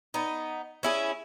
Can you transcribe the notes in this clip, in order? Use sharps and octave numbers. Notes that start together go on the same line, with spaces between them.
B3 D#4
C#4 E4 G#4